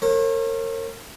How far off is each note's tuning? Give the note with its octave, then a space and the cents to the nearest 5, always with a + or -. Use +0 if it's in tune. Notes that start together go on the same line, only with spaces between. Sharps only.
A#4 -35 C#5 -40